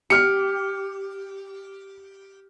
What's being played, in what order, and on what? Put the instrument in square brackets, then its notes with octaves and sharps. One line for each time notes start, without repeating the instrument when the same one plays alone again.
[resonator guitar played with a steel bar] G4 [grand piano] F6 C#7